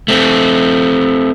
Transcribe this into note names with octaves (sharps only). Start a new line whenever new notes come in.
A3 C4